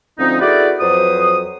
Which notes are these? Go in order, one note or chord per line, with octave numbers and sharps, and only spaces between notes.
D2 F3 C4 C#4 D#4
E4 F#4 G#4 A4 B4 D5
F2 F#3 B4 C5 D#6